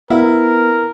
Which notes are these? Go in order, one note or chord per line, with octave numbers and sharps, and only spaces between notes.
B3 E4 A#4